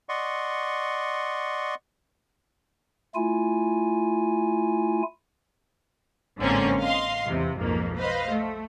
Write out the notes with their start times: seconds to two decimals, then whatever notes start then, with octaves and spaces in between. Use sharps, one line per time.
0.09 D5 D#5 F#5 C6 C#6
3.15 A3 E4 F4 G#5
6.39 A1 G#2 D3 A#3 C4 C#4
6.80 D#5 F5 C6
7.25 E2 C3 E3
7.58 B1 F2 G#2 A#3
7.97 B4 C5 D#5 F5
8.31 A3